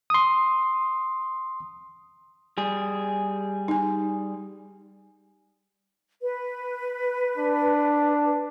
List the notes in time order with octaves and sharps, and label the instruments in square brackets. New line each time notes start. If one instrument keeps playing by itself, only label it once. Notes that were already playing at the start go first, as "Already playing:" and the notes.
[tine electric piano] C6 D#6
[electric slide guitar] G3 G#4
[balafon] D#4 G#5
[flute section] B4
[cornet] D4